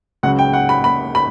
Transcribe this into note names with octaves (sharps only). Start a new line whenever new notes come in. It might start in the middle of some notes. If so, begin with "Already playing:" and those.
C#2 C#3 F#3 F#5
G5
F#5
B5
B5
B5